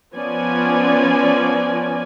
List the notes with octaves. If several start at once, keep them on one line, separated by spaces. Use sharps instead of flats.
F3 B3 C#4 D5 G#5